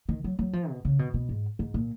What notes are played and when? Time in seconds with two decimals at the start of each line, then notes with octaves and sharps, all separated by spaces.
0.09 D#3
0.24 F#3
0.39 F#3
0.53 F3
0.70 B2
0.85 C#3
0.99 B2
1.14 B2
1.29 G#2
1.59 G#2
1.74 A#2